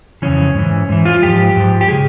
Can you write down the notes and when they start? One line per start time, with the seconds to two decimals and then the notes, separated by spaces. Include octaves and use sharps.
0.22 F2 C#3 E3 C#4
0.55 G#2 E3
0.89 G#2 E3
1.05 F4
1.22 G#2 F3 G4
1.56 G#2 F3
1.81 G4
1.88 C#3 G#4